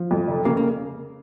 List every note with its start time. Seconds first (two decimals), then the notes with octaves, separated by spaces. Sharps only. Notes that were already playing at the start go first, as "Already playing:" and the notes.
Already playing: F3
0.11 F2
0.28 F1
0.45 C#3 A#3
0.57 A#3